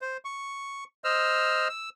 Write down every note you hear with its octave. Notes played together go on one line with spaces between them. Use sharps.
C5
C#6
C5 D#5 E6 F6
E6